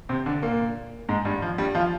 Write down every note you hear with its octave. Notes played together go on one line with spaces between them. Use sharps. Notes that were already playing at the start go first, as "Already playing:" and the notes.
C3 C4
D3 D4
A#2 A#3
G#2 G#3
G2 G3
F3
G2 G3
F3 F4